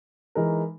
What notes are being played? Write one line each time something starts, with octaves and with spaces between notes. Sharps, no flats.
E3 G#3 D#4 A#4